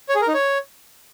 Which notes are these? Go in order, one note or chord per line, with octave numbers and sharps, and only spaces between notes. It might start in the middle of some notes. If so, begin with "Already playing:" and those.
C#5
G#4
A#4
D#4
C#5